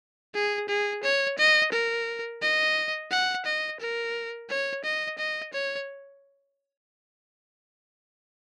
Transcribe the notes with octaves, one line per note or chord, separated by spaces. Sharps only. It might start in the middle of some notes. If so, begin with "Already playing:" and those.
G#4
G#4
C#5
D#5
A#4
D#5
F#5
D#5
A#4
C#5
D#5
D#5
C#5